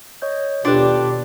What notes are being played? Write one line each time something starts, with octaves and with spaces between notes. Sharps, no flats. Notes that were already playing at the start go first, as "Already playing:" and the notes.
C#5 D#5 G6
D#2 B2 D4 F4 G4 A4 B4